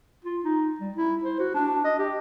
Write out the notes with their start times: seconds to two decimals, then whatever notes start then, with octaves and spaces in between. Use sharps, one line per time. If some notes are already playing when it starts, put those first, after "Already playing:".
0.25 F4
0.44 D#4
0.80 G3
0.96 E4
1.24 C5
1.39 F#4
1.55 D4
1.84 D#5
1.99 G4